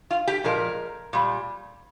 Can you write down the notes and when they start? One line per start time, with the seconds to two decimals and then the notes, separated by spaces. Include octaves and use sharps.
0.11 F4
0.27 G4
0.44 A#2 F3 G#3 A#4
1.13 A#2 G3